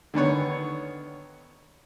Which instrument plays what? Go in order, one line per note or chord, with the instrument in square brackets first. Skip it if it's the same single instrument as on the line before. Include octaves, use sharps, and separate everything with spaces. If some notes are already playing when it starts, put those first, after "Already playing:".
[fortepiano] D3 D#3 B3 C#5